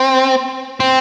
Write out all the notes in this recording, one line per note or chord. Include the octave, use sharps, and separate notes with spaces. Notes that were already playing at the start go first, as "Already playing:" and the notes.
Already playing: C4
C4